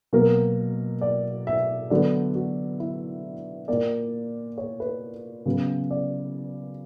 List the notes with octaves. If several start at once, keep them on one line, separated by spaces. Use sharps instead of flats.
B2 F#3 A#3 A#4
D5
E5
D3 F#3 B3 D5
F#4
E4
A#2 A#3 D5
C#5
B4
C#3 F#3 B3
D5